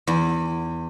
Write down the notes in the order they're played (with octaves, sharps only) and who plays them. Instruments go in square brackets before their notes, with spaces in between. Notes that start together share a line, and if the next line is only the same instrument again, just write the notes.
[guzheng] E2